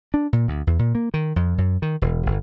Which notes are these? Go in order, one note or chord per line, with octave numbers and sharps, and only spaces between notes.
D4
A#2
D2
E2
A#2
A#3
D#3
F2
F#2
D#3
E1
G1